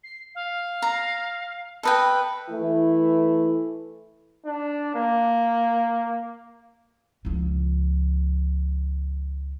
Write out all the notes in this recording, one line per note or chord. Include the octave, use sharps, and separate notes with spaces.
C7
F5
A#5
A4 B4 D#5 G5
E3 A3 E4
D4
A#3
C#2 F3